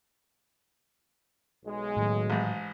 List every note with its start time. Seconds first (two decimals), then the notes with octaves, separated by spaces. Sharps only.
1.64 B1 G#3
1.97 A2 D#3 F#3
2.30 A1 G#2